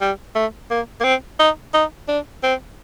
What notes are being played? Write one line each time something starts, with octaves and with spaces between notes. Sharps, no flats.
G3
A3
A#3
A#3
C4
D#4
D#4
D4
C4